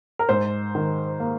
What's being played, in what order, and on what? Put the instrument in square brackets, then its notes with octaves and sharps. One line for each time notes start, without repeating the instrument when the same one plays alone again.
[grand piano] A#4
G#2 C5
D#3
A#3